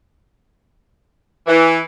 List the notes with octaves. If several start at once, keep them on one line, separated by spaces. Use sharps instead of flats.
E3